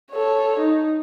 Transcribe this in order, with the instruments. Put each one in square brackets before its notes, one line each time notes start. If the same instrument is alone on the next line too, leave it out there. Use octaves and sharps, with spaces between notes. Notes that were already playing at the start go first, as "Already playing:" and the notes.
[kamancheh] A4 C#5
D#4